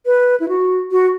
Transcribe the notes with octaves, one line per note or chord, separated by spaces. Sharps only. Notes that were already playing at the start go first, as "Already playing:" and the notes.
B4
E4
F#4
F#4